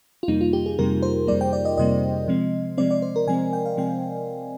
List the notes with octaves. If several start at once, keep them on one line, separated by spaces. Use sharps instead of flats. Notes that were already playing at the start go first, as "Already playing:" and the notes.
F4
F2 C3 G3 A#3 D#4
F4
G4
G#4
F2 C3 G3 A#3 A#4
C5
F2 C3 G3 A#3 D5
G5
D5
D#5
F2 C3 G3 A#3 D#5
C3 F3 G#3 C4
C3 F3 G#3 C4 D5
D5
C5
A#4
C3 F3 G#3 C4 G#5
G5
F5
C3 F3 G#3 C4 G5